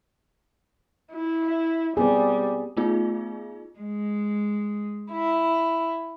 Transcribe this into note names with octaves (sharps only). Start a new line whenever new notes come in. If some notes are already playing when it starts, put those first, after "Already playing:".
E4
G3 B3 C4 G#4
A3 B3 D#4 F4 G#4
G#3
E4